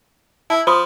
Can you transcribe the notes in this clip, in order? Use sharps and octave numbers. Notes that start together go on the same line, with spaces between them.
E4 A5
F3 B5 C6 D#6